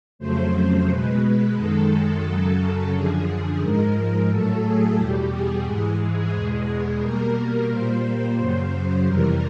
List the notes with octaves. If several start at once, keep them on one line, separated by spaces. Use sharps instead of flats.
F2 C#3 F#3 A3 C5
B2 G#3 B4
F#2 D#3 G#3 A4
F#2 C#3 F#3
F#2 D3 F3 G#4
G#2 F3 G#3 A#4
A2 F#3 A3 A4
G#4
E2 B2 G3 G4
G#4
G#2 E3 G#3
E2 B2 G#3
B2 G3 A#3 A#4
A#2 G3 A#3 C5
F#2 C#3 F#3
F2 C3 E3 G3 A#4